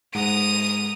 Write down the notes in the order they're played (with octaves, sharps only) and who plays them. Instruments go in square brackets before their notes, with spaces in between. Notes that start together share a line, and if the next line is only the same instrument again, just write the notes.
[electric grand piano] G#2 G#3 F#5 [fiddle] A#5 D#6 [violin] D#7